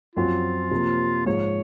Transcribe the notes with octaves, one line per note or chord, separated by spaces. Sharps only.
F#2 F3 C4 F4 F#4
C3 F3 A#3
G#2 F3 G#3 C#5